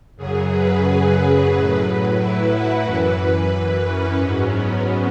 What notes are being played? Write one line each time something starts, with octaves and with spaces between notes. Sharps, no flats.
F#2 C#3 F#3 G#4
B4
B4
A2 F#3 B4
B4
E4
F#4
F#2 E3 B4
B4
C#4
G#2 F#3 C#4
B3